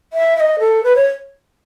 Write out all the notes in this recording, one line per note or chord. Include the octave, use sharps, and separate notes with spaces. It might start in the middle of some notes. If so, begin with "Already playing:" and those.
E5
E5
D#5
A4
B4
C#5